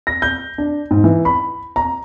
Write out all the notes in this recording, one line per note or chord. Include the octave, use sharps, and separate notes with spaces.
A#6
G6
D4
G#2
E3
B5
A#5